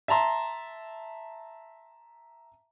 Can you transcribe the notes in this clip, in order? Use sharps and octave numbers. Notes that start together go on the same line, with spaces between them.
E5 A5 A#5 C6